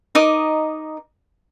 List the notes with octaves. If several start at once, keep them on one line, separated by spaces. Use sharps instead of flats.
D#4 A#4 D#5 D6